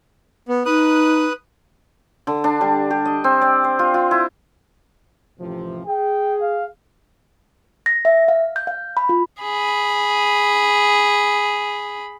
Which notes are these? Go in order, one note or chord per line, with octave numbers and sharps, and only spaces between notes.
B3
D#4 B4 D#6 F#6
D3
D4
G3
G4
D#5
C4
D5
C5
F4
F4
E4
A1 C3 F3
G#4 G5
F5
A#6
E5
F5
G6
F5
B5
F4
G#4 B5